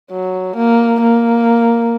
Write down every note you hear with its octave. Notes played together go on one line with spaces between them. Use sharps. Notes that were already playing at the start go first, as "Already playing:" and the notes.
F#3
A#3
A#3